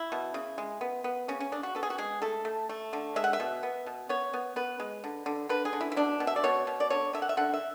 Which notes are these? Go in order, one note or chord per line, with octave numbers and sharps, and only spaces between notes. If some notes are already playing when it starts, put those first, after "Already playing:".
Already playing: E4
B2
C#3
G#3
B3
B3
C#3 C#4
C#4
C#3 D4
F#4
B3 A4
G#4
F#4
G#3 G#4
A3 A4
A3
A3
D3
G#3 E5
F#5
E5
B2
B3
B2
B3 C#5
B3
B3 B4
G#3
D3
D3
D3 B4
G#4
D3
E4
E4
B2 D4
B2
E5
D5
B2 C#5
B2
D5
D3 C#5
D3 E5
F#5
E5
D3 F#5
E5